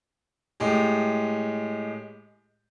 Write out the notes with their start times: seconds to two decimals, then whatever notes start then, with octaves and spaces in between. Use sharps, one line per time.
0.60 A2 G#3 G4